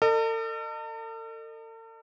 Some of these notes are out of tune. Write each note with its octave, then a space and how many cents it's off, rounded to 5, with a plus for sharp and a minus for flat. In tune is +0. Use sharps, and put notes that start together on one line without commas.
A4 +45 D#5 -35